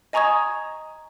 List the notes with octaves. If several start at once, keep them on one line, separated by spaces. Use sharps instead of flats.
D#5 G#5 A#5 C#6 D#6 G#6